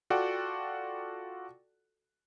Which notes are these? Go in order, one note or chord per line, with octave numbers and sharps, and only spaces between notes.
F4 F#4 A4 D5 F#5 G5